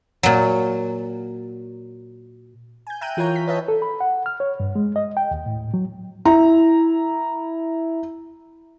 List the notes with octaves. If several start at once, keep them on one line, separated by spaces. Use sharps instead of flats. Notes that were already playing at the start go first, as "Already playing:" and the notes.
A#2 F#3
G#5 G6
E5 G5 A#5 F#6 G6 D#7
E3 F4 A#4 C#5 A#5 G6
B6
B4 C#5 D#5 E5 A5
A4
B5
F#5
F6
C#5
G2
G#3
D#5
G5
D#2
A2
F#3
E4 A#5